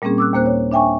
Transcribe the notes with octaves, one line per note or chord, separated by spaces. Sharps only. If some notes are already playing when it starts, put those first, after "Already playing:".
A#2 G3 A#3 C4 C#4 G#4
D6 E6 F#6
D#2 A#2 A#3 C5 F#6
C#5
D4 E5 G5 G#5 C#6